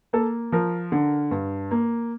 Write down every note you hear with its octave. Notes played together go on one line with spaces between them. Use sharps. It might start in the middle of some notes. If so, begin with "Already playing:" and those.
A#3 A4
F3 A#4
D3
G2
A#3